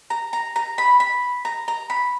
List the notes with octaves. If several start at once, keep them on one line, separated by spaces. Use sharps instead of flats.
A#5
A#5
A#5
B5
B5
A#5
A#5
B5